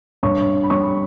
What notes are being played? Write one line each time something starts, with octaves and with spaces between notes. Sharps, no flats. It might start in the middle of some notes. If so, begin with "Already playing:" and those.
G2 C#5 C#6
B5
G3 C#5 C#6